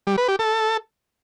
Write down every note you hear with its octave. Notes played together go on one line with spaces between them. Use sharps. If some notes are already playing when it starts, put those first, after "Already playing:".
G3
B4
G4
A4